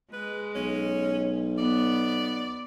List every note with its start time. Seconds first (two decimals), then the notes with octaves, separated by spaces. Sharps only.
0.13 G#3 B4
0.55 B1 C#4
1.58 B3 D5